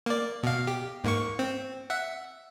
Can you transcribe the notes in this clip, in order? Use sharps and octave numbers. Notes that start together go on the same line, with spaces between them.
A#3 D5
B2 F5
G4
G#2 A#3 C#6
C4
E5 F#5